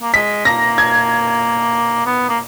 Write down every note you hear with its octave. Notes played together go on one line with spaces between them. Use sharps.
A#3
G#3 B6
A#3 A#6
G#6
B3
A#3